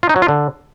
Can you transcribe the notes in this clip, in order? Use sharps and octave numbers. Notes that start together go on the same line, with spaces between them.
F4
D#4
F#3
F4
D3